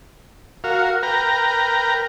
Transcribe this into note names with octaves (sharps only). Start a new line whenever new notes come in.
F#4 A#4 F5
A#4 B4 G5 A#5